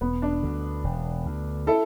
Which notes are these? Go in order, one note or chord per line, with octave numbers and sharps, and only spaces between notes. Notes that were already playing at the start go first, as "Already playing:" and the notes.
E1 B3
D4
D2 D3
E1
D2 D3
E4 A4